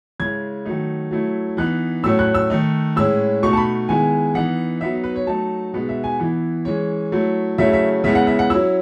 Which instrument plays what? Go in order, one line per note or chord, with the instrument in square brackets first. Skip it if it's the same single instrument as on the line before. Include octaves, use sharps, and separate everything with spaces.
[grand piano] C#3 G#3 C#4 E4 G#6
D#3 F#3 A3 D#4
F#3 A3 E4
E3 B3 D#4 F#6
A2 F#3 A3 C#4 E6
F#6
E6
D#3 A3 D#4
A2 G#3 C#4 E4 E6
B2 A3 D#4 C#6
A5
B5
D#3 G#3 B3 E4 G#5
E3 B3 D#4 F#5
F#3 B3 D#4 E5
B4
C#5
F#3 A3 D#4 A5
B2 G#3 B3 D#4
E5
G#5
E3 B3 E4
E3 G#3 C#4 C#5
F#3 A3 E4
C#3 F#3 A3 C#4 E4 E5
E5
C#3 G#3 B3 E4 E5
F#5
E5
F#5
F#3 C#4 E4 E6